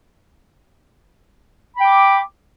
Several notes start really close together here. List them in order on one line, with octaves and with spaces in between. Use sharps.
B5 G5 D6